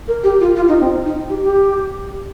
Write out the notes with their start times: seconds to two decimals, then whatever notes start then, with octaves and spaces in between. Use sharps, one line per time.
0.08 A#4
0.24 G4
0.40 F4
0.56 F4
0.69 D#4
0.80 C4
1.05 D#4
1.30 G4
1.42 G4